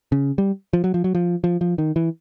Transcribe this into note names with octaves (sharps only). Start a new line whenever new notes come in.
C#3
G3
F3
F#3
F3
F#3
F3
F3
F3
D#3
E3